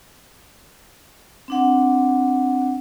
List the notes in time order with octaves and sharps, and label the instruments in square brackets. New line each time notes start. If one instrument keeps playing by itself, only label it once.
[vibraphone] C4 D4 F#5